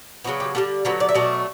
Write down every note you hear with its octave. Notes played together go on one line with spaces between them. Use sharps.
C#3 F#3 B3 F#4
G4
D3 G3 B3 A4
D3 F#3 B3 B4
D5
E5
B2 F#3 A3 D5